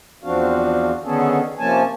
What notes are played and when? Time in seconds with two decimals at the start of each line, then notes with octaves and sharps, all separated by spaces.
0.24 E2 F3 C4 D4 F#4 F5
1.04 D3 D#3 B3 C#4 G#4 A4
1.59 C3 F3 A#3 C#4 G#5 A5